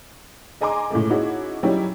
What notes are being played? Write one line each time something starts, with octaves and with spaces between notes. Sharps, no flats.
G#4 D#5 G#5 A#5 C6 D6
A2 C#3 G#3 A3
C#4 D#4 E4 F#4 G#4
F#3 G3 C#4 D#4 E4 G4